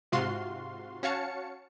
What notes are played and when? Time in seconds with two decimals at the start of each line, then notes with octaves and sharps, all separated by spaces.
0.12 G#2 C3 F4 F#4 F5 C6
1.03 C#4 F#4 C#5 F5 A5 C#7